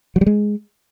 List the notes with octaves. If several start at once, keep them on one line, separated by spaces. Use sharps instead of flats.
F#3
G3
G#3